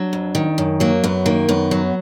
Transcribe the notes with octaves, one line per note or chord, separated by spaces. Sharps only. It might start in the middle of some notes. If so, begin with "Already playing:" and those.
Already playing: F#3 D4
F2
D#3
F#2
F#3 A#3
F#2 B3
D#3 A#3
F#2 B3
F#3